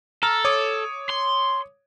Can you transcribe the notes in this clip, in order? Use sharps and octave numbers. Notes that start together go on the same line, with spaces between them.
A4 A#5 F6
C#5 D6 D#6
C6